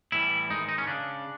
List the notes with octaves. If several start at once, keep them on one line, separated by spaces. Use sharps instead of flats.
A2 E3 G3 E4
G#2 D#3 G#3 D#4
D#4
C#4
C#3 D4